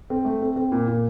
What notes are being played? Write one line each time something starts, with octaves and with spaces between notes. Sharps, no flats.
C4
A3
C4
C4
A#2
A#2